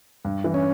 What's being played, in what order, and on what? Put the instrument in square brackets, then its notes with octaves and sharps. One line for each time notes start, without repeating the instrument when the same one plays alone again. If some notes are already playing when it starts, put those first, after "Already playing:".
[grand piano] G2
E3
[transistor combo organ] C#4